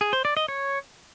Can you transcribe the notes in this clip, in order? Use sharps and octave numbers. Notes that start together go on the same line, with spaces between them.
G#4
C5
D5
D#5
C#5